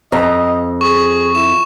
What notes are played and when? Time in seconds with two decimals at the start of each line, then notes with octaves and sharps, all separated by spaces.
0.12 F2 D#5 A#5
0.81 G#4 C#6
1.35 E4 E7